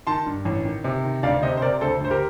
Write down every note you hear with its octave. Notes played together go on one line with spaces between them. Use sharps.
D#3 A5 C6
G2
A1
D#3
C3
D#3
D2 D5 F5
C3 C5 D#5
C5
C3 A#4 D5
D2 A4 C5
D2 C5
G4 A#4